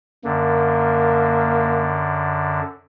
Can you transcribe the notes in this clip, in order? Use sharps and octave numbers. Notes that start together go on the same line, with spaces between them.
F#2 D3 A#3